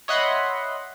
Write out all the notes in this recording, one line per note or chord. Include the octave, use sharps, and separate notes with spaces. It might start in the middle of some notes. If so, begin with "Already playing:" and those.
C#5 D#5 E5 F#5 B5 C6